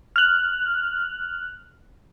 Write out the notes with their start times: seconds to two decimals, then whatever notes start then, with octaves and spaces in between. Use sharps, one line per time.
0.16 F6 F#6